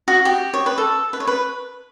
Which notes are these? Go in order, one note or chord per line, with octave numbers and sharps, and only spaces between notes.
F#4
G4
C#5
B4
A4
B4
C#5
B4